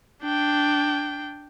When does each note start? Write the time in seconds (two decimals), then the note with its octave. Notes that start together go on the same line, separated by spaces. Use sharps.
0.23 D4 G5